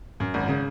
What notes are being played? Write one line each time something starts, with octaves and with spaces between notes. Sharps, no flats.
F#2
G#1
C#3